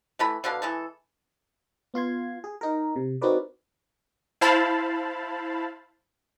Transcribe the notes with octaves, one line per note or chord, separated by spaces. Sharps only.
E3 A3 B5
B2 D3 B4 F5
E3 G#3 A4
B3 F4 C6 G#6
G#4
D#4 A#4
C3
C4 D#4 F#4 A#4 B4 D5
E4 C5 F5 A5 B5